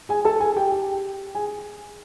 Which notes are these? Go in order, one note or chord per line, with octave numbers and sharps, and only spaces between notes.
G#4 G#5
A4 A5
G#4 G#5
G4 G5
G4 G5
G#4 G#5